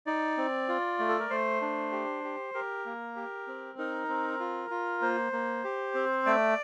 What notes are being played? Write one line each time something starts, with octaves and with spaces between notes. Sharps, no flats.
D#4 D5
C4
F4
A3
A4
A#4
A3 C5
D4
G4
G4
G4 A#4
A#3
G4
C4
D#4 A#4
C4
F4
F4
A#3 C5
A#3
G4
C4
A3 D5